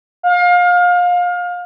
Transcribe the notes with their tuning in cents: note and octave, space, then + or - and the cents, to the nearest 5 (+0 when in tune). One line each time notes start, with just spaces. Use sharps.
F5 +30